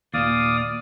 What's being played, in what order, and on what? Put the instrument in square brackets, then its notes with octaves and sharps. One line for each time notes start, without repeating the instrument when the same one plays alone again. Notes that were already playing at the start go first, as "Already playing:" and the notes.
[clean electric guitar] D#2 A#2 [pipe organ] D5 F5 D#6